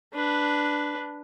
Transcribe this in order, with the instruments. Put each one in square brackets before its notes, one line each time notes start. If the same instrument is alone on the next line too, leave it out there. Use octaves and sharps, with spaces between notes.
[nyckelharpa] D4 B4